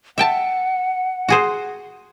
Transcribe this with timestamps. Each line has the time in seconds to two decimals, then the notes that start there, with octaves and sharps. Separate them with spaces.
0.18 E5 F#5 G5 A5
1.29 F#4 G#4 C5